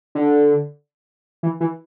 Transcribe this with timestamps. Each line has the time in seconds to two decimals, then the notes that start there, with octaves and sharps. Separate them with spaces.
0.15 D3
1.43 E3
1.60 E3